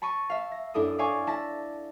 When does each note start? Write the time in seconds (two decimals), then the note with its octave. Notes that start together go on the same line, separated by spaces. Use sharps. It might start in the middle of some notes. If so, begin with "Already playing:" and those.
0.02 A5 B5 C#6 A#6 D#7
0.30 E5 F5
0.52 A#6
0.74 F#2 D4 E4 A4 D#6
0.98 D5 E5 F5 G#5 C#6 D6
1.27 E4 A5 A#6 B6